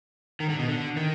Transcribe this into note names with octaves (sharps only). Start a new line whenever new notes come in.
D#3
D3
B2
D3
D#3